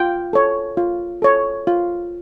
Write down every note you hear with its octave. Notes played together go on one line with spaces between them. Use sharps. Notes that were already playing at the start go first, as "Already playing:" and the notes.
Already playing: F4 G5
A4 C#5
F4
A4 C#5
F4